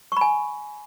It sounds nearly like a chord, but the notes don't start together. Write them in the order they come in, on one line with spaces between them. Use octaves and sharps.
C#6 B5 G#5